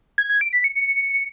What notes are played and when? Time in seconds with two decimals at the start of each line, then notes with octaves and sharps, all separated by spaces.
0.18 G#6
0.30 G#6
0.41 D7
0.53 B6
0.64 C#7